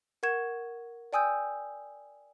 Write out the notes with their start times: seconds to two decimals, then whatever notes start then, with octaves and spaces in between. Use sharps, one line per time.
0.23 A#4 F#5 C#6 G#6 E7
1.13 D5 G5 G#5 D#6 E6 G6